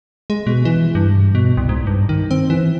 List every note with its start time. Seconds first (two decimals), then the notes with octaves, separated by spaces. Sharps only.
0.30 G#3
0.47 B2
0.65 E3
0.95 G2
1.35 B2
1.57 C2
1.69 G#2
1.87 G2
2.09 D#3
2.31 C4
2.50 E3